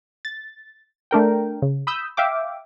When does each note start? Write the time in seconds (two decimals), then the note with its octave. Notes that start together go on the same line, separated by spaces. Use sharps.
0.25 A6
1.11 A3 D4 A#4 G5
1.62 C#3
1.87 B5 D#6 E6 G6
2.17 E5 F5 G5 D6